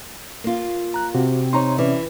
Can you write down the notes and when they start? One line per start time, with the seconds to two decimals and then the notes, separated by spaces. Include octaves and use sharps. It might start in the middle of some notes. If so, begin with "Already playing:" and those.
0.44 A#3 F4
0.94 A#5 F#6
1.14 C3 F#4
1.53 D#4 C#5 A#5 C6
1.78 E3 C#4 D5 E5